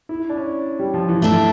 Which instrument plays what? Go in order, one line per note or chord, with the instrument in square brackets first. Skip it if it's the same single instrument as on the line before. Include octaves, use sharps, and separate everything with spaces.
[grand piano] E4
D4
C#4
G3
F3
E3
[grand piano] E3 [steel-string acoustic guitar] A3 D4 A4